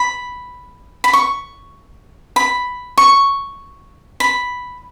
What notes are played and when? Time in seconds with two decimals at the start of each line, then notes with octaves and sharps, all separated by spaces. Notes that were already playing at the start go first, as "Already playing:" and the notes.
Already playing: B5
1.04 B5
1.13 C#6
2.36 B5
2.98 C#6
4.20 B5